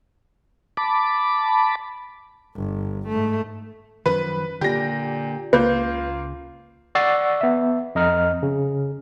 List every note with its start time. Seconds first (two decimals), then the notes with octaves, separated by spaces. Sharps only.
0.77 A5 B5 D6
2.55 G1
3.08 G#2 A3
4.06 F#2 D#3 F3 B4
4.61 A#2 D3 A#3 G4 A#6
5.53 C#2 C#3 A#3 F4 B4 G6
6.95 D5 F#5 C#6 E6 A6 C7
7.41 B3 E5
7.95 F2 D#5 A#5 F6
8.43 C#3